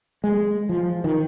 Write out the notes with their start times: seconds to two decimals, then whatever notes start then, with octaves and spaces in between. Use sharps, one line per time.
0.24 G#3
0.69 F3
1.04 D#3